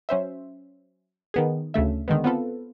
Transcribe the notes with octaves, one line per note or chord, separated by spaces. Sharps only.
F#3 C#4 C5 E5
D#3 B3 G#4
D2 C#3 A3 E5
D3 D#3 G#3 B3
B3 C4 F4 A4 B4